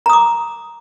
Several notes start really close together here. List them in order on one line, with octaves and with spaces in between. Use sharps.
A#5 D#6 D6